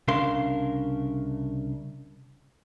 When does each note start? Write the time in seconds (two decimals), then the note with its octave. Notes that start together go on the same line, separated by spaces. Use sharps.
0.08 C2 C#3 D4 A#4 F5 C6